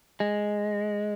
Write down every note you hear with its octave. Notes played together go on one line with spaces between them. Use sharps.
G#3